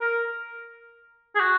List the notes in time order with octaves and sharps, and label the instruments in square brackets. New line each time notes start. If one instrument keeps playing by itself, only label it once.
[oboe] A#4
G#4
F#4